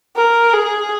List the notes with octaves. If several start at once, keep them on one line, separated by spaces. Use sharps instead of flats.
A#4
G#4